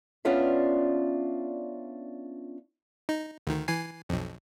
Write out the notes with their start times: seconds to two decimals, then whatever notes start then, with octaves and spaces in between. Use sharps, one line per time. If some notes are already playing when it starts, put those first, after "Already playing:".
0.25 B3 C#4 D4 F4 D5 E5
3.09 D#4
3.47 D2 D#3
3.68 E3 G#5 C7
4.09 B1 F2